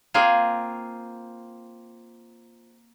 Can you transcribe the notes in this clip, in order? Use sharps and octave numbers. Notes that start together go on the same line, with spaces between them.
A#3 C4 F4 G#4